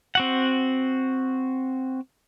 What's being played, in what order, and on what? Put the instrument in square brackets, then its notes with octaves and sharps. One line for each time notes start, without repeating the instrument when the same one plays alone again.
[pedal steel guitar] C4 F#4 F#5